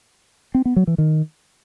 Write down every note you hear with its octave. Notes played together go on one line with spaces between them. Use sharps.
C4
B3
F#3
E3
D#3